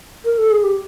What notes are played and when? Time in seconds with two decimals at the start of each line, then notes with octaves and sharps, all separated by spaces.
0.25 A#4
0.38 A4
0.51 G#4
0.64 G4